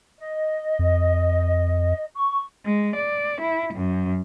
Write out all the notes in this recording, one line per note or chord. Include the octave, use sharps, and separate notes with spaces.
D#5
F2
C#6
G#3
D5
E4
F#2